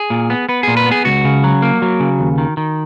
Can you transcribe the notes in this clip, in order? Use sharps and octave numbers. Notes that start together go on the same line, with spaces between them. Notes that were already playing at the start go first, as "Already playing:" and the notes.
Already playing: G#4
A#2
B3
B3 B4
A#2 G#4
B4
B3
G#4
C#2 F#4
C#3
F#3
A#3
F#3
C#3
D#2
D#3
D#3